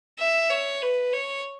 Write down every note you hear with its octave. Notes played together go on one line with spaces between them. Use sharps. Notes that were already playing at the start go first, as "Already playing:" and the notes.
E5
C#5
B4
C#5